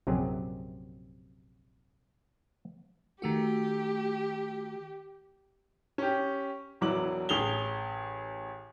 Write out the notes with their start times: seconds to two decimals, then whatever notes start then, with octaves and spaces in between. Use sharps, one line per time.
0.07 A#1 F#2 C3 F#3 G4 G#4
3.22 D#3 A3 F#4 G4
5.98 C#4 G4
6.81 E1 E3 F#3 D6 F#7
7.29 A1 G#4 F7 G7